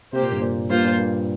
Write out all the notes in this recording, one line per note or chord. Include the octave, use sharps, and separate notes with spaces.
C3 A#3 G4 C5
A#2
G2
A#2
G2 A#3 F4 C5
A#2
G2